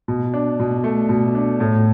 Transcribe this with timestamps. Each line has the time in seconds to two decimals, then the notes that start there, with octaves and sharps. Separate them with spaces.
0.08 B2
0.34 D4
0.60 B2
0.84 A3
1.09 B2
1.35 D4
1.60 A2